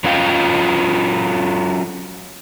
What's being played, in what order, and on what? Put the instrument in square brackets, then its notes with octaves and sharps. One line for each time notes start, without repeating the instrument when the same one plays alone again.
[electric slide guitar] F#3 C#4 F4 D#5 F5 G5